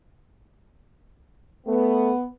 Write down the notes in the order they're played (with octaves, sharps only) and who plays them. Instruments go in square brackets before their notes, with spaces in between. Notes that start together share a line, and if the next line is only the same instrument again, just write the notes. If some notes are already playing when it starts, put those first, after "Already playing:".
[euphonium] A3 [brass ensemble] B3